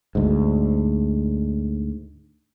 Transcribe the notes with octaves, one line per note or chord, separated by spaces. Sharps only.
D2 G#2